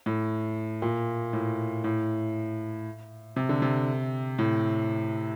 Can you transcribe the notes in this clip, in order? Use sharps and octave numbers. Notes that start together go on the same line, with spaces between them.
A2
A#2
A2
A2
C3
D3
C3
A2